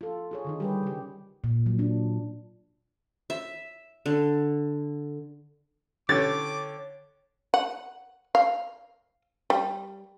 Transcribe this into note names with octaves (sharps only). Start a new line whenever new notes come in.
F4 A4
F4 G#4 C#5
D3 D#3 D#4
G3 G4 G#4 B4
C#3 G4
A#2
F#3
D4
E5
D3
D3 C#4 C#5 G5 D6 A6
F#5
F5
G3